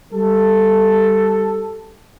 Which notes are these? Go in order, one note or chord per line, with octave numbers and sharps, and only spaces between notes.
G3 G4 A4